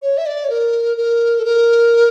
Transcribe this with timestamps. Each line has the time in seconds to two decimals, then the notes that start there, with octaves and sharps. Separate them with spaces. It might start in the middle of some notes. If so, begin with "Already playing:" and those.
0.02 C#5
0.18 E5
0.26 D5
0.44 C#5
0.50 A#4
0.97 A#4
1.39 A4
1.45 A#4